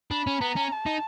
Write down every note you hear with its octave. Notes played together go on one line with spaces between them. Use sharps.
D4 B5
C#4
B3 A#5
C#4
A5
D#4